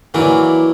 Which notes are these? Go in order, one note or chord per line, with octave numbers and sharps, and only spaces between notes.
E3 F#3 A#3 D4 F#4 A#4